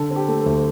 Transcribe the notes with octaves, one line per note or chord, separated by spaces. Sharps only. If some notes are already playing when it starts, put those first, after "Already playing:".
Already playing: D3 A4
C4
G4
A3
A4
D2